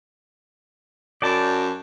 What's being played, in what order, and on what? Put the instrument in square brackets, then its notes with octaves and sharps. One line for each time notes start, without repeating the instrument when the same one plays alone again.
[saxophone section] F#2 [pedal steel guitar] D5 G5 A5